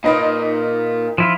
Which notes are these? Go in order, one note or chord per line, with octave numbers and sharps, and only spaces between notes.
A#2 D#4 B4 D#5
F3 E4 F4